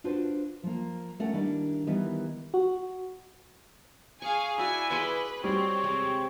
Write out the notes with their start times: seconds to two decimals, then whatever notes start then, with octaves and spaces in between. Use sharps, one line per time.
0.04 D4 F4 F#4 B4 C5
0.63 F3 A#3
1.20 A3 C#4 A#4 F#5
1.34 D#3 G3 A#3 D4 E4
1.87 D#3 E3 G3 B3 E4
2.54 F#4
4.22 G#4 F5 G#5 C#6
4.58 E4 F#4 D5 F5 G#5
4.91 G#4 B4 C6 D6 C#7 D#7
5.44 G3 C4 F#4 C#5
5.84 C3 G#3 G4